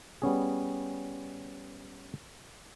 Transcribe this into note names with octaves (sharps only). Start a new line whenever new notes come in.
G3 B3 C#4 G#4